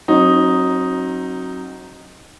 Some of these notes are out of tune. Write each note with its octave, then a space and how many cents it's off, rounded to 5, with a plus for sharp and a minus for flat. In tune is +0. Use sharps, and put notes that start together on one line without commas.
F#3 +0 C4 +45 D#4 +0